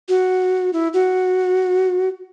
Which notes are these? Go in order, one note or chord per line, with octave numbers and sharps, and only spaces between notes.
F#4
E4
F#4